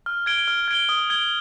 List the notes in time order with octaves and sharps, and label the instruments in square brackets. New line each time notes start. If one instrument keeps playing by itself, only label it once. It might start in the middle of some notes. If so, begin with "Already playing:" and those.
[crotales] F6
G#6 D7 G7
F6
G#6 D7 G7
D#6
G#6 D7 G7